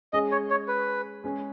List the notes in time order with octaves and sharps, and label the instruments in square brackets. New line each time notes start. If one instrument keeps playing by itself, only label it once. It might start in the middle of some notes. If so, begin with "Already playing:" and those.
[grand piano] G#3 C#4 G#4 [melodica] D#5
[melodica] C#5
C#5
B4
[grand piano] G#3 C#4 G#4